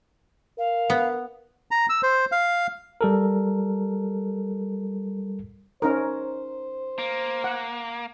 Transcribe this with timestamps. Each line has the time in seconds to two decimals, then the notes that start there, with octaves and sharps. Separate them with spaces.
0.58 A#4 F5
0.90 B3
1.71 A#5
1.89 E6
2.03 C5
2.32 F5
3.01 G3 A4 A#4
5.82 C#4 D#4 A#4 C5
6.98 A#3
7.44 F#5